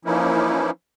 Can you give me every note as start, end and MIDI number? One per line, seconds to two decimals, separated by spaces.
0.05 0.70 52
0.05 0.70 53
0.05 0.70 58
0.05 0.70 61
0.05 0.70 63
0.05 0.70 64